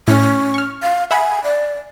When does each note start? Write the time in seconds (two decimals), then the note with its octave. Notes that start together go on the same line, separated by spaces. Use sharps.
0.08 A2 C#4
0.54 C#6 F6
0.82 F5
1.11 E5 F#5 G#5 B5
1.44 D5